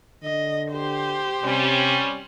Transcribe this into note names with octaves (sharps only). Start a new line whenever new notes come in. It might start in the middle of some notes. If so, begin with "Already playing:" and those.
D3 D#5
G4 C5
C3 G3 C#4